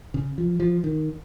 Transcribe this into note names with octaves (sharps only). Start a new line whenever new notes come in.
C#3
F3
F3
D#3